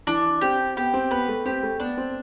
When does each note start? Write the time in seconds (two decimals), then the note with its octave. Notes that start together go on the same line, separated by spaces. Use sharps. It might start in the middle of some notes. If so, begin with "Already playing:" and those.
0.07 E3 D4
0.41 C4 G4
0.77 B3 G4
0.94 C4
1.11 B3 B4
1.28 A3
1.45 C4 G4
1.63 A3
1.80 B3 D4
1.98 C4